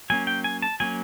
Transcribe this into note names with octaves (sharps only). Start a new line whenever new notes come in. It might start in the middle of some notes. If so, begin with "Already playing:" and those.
F#3 A#3 C#4 G#5
G5
G#5
A5
F#3 A#3 C#4 G#5